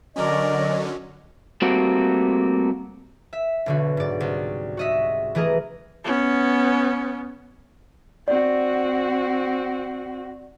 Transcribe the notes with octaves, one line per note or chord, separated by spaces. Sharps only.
D3 F#3 C#4 A#4 D5 D#5
G3 A3 A#3 C4 F#4
E5
B1 D3 F#4
G#2 D5
C2
F#4 D#5 E5
E3 A3 G#4 A#4 D#5
B3 C#4
C4 F#4 D5